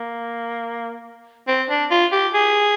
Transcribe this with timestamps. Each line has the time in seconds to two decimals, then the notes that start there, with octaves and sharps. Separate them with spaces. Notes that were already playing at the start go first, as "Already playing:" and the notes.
Already playing: A#3
1.48 C4
1.70 D4
1.91 F4
2.12 G4
2.34 G#4